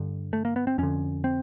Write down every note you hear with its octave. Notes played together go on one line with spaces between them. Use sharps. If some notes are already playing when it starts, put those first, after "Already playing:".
Already playing: G2 D3
A3
A#3
B3
C4
F2 D3 C#4
C4